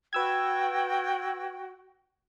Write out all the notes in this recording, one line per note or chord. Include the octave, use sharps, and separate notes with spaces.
F#4 B4 G5 E6 G#6